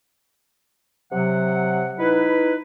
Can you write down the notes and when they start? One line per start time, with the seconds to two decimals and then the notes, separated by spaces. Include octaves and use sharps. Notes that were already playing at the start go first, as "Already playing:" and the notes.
1.12 C3 F#3 F#5
1.99 D#4 E4 B4